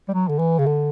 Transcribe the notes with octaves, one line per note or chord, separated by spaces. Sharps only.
G3
F#3
D3
E3
C#3
D3